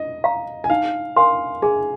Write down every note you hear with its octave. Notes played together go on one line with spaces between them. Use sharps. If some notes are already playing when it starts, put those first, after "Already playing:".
Already playing: D#5
F5 A#5
G#5
D#4 F5
A#4 F5 G#5 C6
G#4 G#5